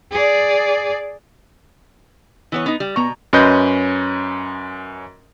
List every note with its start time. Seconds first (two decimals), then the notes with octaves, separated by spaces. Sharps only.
0.12 G#4 D5
2.52 E3 B3 C#5
2.66 B3 D#4
2.80 G3
2.96 B2 B3 A#5 C#6
3.33 F#2 C#4 B4 D#5 C6 G6